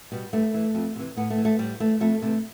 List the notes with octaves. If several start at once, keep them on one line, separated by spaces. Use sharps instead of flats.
B2 G3
G2 A3
E3
F2
C3 E3
A2 B3
A3
E3
A3
A2 G3
E3 A3
F2 A3
C3 E3 A3